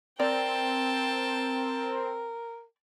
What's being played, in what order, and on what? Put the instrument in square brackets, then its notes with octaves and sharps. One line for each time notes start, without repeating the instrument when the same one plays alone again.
[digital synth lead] C4 [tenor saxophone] A#4 [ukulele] D5 [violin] G5 A5